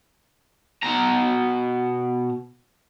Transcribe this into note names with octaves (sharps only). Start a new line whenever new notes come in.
B2 A#5